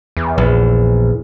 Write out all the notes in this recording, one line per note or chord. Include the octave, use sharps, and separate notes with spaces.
E2
A#1